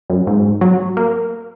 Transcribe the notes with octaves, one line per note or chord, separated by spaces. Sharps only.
F#2
G#2
F#3
A#3